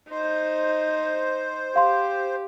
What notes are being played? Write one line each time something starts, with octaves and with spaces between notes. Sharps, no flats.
D#4 C5
G4 F5 C6